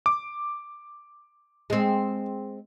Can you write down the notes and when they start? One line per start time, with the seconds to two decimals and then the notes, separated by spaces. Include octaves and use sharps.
0.06 D6
1.70 G#3 C4